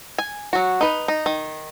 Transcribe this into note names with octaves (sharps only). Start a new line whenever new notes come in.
G#5
F#3 F#4
D#4 B4
D#4
D#3